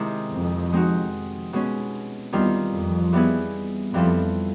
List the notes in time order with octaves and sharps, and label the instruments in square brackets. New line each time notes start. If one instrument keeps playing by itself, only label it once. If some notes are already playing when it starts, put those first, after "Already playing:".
Already playing: [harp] C3 D#3 G#3 C4 E4
[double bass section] F2
[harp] G#3 C4 D#4 F#4
B2 G#3 C#4
[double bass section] E2 [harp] D#3 G3 C4 F4
[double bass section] F2
[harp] E3 G3 B3 E4 G#4
[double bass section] F2 [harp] E3 G3 C4 F4 A4